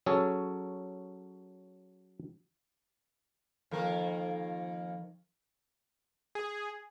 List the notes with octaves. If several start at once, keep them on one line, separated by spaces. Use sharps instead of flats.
F#3 C#4 G#4 A4
F2 D#3 F3 A#3 A#4 F5
G#4